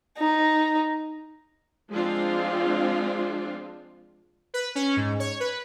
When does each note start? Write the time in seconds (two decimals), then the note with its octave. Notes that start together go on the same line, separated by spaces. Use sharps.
0.17 D#4
1.91 F3 G#3 C4 D4 F4
4.54 B4
4.75 C#4
4.97 G#2
5.20 C#5
5.40 B4